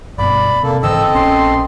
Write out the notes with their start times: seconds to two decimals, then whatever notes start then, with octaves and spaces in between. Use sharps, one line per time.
0.18 G1 G2 B2 D5 B5
0.63 C3 A#3 A4
0.83 G#2 D3 E3 C4 A4 D#5 E6
1.15 A#1 C#4 C6